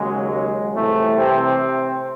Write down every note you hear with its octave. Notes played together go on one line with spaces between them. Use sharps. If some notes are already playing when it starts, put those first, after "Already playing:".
Already playing: D#2 C#3 F#3 G#3
G#3
C2 A2 C3 E3 A3
C3 C4